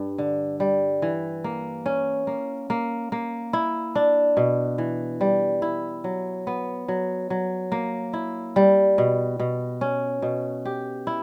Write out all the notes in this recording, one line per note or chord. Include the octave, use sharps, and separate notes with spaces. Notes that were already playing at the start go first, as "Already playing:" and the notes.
Already playing: G2
D3
G3
E3
A#3
C#4
A#3
A#3
A#3
E4
D4
B2
E3
G3
E4
F#3
B3
F#3
F#3
A#3
E4
G3
B2
B2
C#4
B2
G4
E4